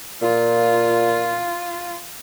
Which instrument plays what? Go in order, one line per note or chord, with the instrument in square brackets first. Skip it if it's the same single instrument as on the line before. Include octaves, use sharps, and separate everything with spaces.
[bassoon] A#2 [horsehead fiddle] F4